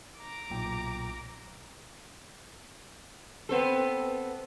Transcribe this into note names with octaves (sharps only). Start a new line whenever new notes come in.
A#5 D6
B1 A#2 G5
B3 C4 A4